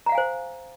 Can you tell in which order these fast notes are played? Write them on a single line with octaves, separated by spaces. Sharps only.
A#5 F#5 F5 G#5 C5